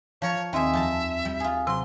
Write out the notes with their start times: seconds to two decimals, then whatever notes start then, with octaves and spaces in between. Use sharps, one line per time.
0.22 F3 A#4 C#5
0.53 D#2 D#3 C4 G#4 E5
0.73 F2 A5 A#5
1.25 G3
1.40 F4 G#4
1.67 C3 F#3 C6